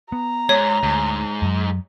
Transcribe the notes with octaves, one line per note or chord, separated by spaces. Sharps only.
B3 A#5
G#2 C#5
D2 G#2
F#2 F#3